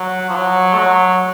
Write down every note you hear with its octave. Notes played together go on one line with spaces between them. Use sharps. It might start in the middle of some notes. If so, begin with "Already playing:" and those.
Already playing: F#3
F3
F#3
A3
F#3